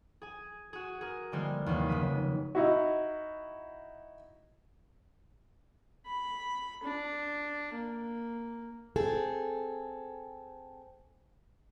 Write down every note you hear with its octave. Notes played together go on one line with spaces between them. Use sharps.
G#4 G#5
F#4 G#4
G#4 A#4
D3 E3 G3 G#3 A#3 C5
D#2 C3 E3 F#3 A#3
F1 C#3 G#3 A#3 B6 D#7
D#4 E4 F#4
B5
D4
A#3
C4 G#4 A4